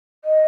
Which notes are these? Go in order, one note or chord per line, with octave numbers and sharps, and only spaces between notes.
D#5